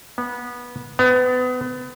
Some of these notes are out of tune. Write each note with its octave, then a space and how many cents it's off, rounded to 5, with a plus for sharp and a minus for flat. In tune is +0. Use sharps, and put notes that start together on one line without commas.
B3 -20
B3 +30